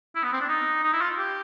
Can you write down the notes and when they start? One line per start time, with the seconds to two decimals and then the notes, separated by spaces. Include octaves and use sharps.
0.16 E4
0.24 B3
0.33 C4
0.41 D4
0.49 D#4
0.84 D#4
0.93 E4
1.01 F4
1.18 G4